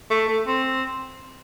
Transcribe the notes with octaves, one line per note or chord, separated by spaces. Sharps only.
A3
A3
C4